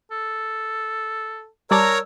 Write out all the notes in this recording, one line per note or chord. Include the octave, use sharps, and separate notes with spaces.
A4
G3 A#4 C#5 D5 A5 A#5 E6